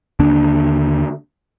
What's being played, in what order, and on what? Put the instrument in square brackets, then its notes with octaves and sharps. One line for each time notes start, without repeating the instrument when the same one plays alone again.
[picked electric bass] D#2 D3 A#3 D4